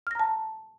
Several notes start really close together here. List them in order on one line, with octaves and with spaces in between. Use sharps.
F6 A#6 A#5 A5